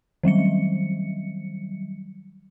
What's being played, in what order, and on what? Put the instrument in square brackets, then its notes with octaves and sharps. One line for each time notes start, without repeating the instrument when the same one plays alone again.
[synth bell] D#3 F#3 G3 C#7